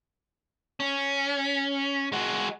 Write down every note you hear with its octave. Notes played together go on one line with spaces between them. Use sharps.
C#4
G#3 F#4